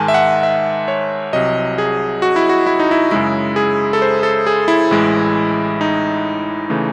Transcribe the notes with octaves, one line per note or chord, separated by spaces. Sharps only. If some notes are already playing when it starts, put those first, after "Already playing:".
Already playing: G#2 D#3 G#3 G#5 A5
E5
F#5
E5
C#5
C2 C3 F#3 D#5
G#4
F#4
E4
F#4
E4
D#4
E4
F#2 C#3 G#3 E4
G#4
A4
C5
A4
G#4
E4
A1 A2 E3 G#3
D#4
C#3 E3 A3